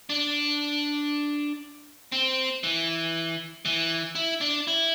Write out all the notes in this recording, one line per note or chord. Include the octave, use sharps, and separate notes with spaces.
D4
C4
E3
E3
E4
D4
E4